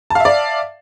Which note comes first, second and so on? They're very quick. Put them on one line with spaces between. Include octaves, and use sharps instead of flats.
A5 F5 E5 D5